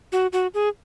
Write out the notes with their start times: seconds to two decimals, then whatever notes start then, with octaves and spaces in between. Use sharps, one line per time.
0.12 F#4
0.33 F#4
0.54 G#4